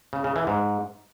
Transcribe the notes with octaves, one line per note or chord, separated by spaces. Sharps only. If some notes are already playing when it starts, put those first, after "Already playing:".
C#3
C#3
E3
G#2